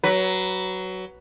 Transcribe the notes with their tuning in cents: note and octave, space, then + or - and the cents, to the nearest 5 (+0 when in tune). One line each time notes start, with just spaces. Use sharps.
F#3 +15 B4 +0